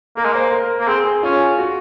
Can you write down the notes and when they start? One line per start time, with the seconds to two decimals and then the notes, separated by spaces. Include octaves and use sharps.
0.17 A#3 A#4
0.25 G#3
0.32 A#3 C5
0.52 A#4
0.80 A#3
0.87 C4 G#4
1.05 G#4
1.23 C#4 F4
1.58 F#4